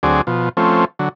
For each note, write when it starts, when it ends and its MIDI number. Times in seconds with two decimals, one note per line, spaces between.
0.03 0.21 38
0.03 0.21 54
0.03 0.21 60
0.03 0.21 68
0.03 0.21 74
0.27 0.49 47
0.27 0.49 53
0.57 0.85 53
0.57 0.85 57
0.57 0.85 60
0.57 0.85 61
0.99 1.09 50
0.99 1.09 54